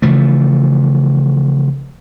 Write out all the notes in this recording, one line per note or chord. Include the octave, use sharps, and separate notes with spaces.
C#3 E3 F3 A3